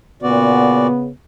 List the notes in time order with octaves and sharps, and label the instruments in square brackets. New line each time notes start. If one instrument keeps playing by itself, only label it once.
[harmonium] A#2 F#4 D5 [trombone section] C#3 B3